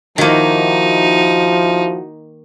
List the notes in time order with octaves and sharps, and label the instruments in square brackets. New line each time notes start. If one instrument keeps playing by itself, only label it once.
[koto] D#3 A#3 [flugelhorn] F3 [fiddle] D#4 [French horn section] E4 F#4